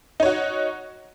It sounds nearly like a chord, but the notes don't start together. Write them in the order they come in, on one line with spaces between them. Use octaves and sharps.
D#4 C#5 F#4